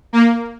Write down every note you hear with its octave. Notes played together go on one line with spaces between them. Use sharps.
A#3